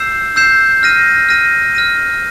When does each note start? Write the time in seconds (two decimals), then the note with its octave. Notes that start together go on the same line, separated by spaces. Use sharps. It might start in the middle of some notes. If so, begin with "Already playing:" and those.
Already playing: E6 G6 C7 E7
0.36 E6 G6 C7 E7
0.83 F6 A#6 D#7
1.29 F6 A#6 D#7
1.75 F6 A#6 D#7